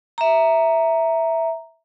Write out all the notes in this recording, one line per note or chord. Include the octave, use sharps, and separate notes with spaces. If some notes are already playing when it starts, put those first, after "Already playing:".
E5 A#5